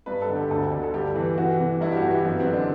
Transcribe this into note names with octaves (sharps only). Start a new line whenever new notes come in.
G2 B4
A4
D3
G4
D2 A4
D3
A4
G2 G4
E3
E3 F#4
C3
G2 E4
G4
F#4
E3
G4
F#2
B3
C4
D3
D4